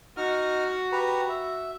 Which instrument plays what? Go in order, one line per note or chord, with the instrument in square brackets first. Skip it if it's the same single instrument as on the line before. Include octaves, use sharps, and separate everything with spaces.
[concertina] D#4 F6 [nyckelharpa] F#4
[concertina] G4 B4 A#5
E5